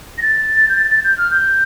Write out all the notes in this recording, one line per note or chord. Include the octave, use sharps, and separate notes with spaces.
A#6
A6
G6
A6
A6
G6
F6
G6